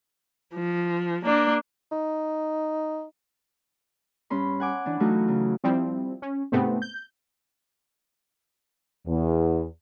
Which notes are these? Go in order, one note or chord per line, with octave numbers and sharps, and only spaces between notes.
F3
A#3 D4
D#4
G2 C#4 B5 C6
F#5 G#5 D6
E3 D4
E3 F#3 A3 D#4 F4 F#4
C#3
F3 G3 C4 E4
C#4
G#2 C3 A3 B3 C4
G6
E2